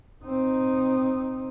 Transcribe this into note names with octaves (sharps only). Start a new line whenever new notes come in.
C4 D#4